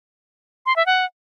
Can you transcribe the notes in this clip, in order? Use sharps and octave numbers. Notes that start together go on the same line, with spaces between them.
C6
E5
F#5